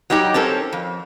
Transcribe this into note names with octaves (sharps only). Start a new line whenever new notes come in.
F#3 G3 D#4 G4
C4 C#4 A4 A#4
F2